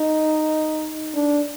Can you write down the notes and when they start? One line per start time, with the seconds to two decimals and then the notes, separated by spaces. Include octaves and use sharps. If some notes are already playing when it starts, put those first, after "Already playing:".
Already playing: D#4
1.15 D4